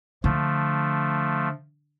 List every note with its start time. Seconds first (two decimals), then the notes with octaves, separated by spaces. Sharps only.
0.24 D3 F3 A3